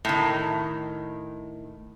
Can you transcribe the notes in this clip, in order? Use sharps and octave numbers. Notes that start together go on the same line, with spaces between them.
A2 D#3